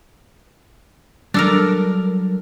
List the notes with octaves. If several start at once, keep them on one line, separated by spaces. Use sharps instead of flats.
F#3 G3 D4 A4 A#4